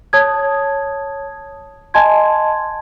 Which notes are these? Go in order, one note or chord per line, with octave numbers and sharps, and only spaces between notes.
C#5 A5 D#6 G#6
D#5 G#5 A5 C6 G#6